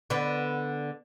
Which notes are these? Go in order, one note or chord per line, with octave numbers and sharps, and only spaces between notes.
D3 B3